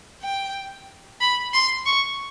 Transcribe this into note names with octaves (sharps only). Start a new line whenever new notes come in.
G5
B5
C6
C#6